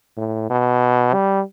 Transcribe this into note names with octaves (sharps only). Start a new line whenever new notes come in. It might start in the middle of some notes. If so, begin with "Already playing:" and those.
A2
B2
G3